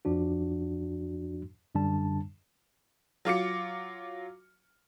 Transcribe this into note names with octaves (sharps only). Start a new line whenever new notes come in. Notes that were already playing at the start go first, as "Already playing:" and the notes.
F2 F3 D4 F#4
F#2 D3 G3 D4 A5
F#3 F4 D6 C#7